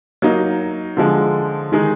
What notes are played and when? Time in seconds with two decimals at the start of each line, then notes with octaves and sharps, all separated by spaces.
0.22 F#3 A#3 D#4
0.97 D3 F3 G#3
1.72 D#3 G#3 D#4 G#4